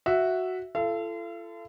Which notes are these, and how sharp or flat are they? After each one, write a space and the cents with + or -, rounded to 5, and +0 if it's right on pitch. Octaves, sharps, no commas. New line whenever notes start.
F#4 +0 E5 +0
F4 -45 A4 +0 F5 -40